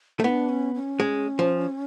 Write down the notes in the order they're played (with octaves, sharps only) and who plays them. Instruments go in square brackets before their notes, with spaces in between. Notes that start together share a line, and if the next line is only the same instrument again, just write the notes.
[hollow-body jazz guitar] A3
[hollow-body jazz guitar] B3 [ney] E4
[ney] D4
C#4
C#4
[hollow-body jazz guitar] G#3
F3